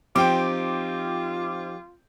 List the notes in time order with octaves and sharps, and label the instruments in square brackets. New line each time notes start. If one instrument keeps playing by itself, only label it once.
[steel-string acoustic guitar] F3 D#4 G4 [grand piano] C4 G5 D7 [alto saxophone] F4 [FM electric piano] D6